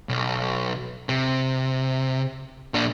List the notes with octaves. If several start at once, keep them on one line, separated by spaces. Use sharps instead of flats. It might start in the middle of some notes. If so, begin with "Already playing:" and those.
B1
C3
A#2 D4